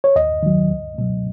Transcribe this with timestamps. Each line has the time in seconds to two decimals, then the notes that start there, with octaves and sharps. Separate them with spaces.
0.04 C#5
0.16 D#2 D#5
0.43 D#3 F#3
0.71 C#2
0.98 B2 F#3